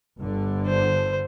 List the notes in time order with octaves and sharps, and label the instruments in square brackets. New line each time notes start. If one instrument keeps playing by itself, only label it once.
[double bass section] G1 G2 D3
[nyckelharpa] C5